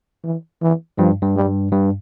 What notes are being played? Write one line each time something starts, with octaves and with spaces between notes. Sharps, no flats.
E3
E3
G2 F3
G2
G3
G2